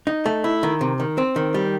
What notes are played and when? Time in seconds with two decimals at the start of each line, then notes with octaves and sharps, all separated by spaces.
0.07 D#4
0.26 A3
0.44 E4
0.63 D#3
0.81 C3
1.00 D#3
1.18 C4
1.36 D#3
1.54 G3